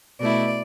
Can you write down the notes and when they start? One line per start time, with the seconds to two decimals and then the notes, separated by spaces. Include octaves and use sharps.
0.20 B2 A3 E4 D5